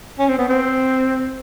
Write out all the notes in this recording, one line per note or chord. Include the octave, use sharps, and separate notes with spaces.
C#4
C4
B3
C4